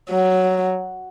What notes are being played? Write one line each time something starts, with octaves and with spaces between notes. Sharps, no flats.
F#3